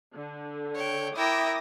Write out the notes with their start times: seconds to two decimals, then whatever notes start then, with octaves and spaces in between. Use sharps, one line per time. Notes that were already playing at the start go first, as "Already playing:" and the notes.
0.15 D3
0.75 C#5 G5
1.16 E4 A#4 E5 G5 D6 D#6 A#6